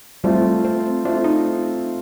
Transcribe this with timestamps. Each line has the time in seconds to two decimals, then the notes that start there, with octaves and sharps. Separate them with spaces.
0.24 G3 A3 C4 F4
0.65 C4
1.05 A3 C4 D4 F4
1.24 D#4